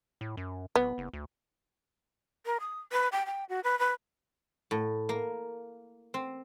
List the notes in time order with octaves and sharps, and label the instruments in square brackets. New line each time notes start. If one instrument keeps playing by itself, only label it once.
[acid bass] A2
F#2
[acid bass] D1 [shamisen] B3
[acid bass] F#1
D2
[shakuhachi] A#4
D#6
B4
G5
G5
F#4
B4
B4
[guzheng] A2
A#3
C4